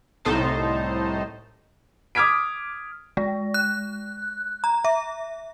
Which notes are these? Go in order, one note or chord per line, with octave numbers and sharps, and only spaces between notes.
C2 A2 D#4 C5 A5
D6 D#6 F6 G#6 B6 D7
G#3
F#6
A#5
E5